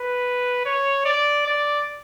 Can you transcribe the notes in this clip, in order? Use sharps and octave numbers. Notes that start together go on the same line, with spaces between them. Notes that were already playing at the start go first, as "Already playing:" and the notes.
Already playing: B4
C#5
D5
D5